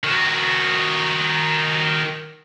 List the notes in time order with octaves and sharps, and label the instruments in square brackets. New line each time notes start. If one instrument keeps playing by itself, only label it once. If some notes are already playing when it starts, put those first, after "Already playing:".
[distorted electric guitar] D#3 F#4